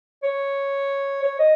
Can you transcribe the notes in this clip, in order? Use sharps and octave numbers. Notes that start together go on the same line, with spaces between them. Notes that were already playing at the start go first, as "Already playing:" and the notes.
C#5
C#5
D#5